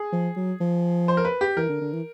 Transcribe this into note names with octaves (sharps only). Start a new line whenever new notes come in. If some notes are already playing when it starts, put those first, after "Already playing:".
Already playing: G#4
F3
F#3
F3
C5
A#4
B4
G4
E3 A#4
D3
D3
E3